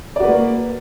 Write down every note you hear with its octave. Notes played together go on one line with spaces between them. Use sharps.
A#3 F#4 B4 D5